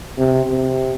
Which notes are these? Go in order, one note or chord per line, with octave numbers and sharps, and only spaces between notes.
C3
C3